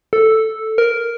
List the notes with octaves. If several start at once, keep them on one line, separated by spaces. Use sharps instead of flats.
A4
A#4